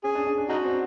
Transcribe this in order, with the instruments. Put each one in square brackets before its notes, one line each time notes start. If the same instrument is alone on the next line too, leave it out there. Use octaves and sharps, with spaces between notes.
[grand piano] C#4 [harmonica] G#4
[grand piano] D4
D4
D4
[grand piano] D4 [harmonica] D#4 F#4
[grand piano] C4